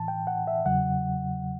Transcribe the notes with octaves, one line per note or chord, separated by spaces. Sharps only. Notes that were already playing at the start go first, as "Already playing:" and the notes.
Already playing: A2 E3 A5
G5
F#5
E5
E2 C#3 F#3 F#5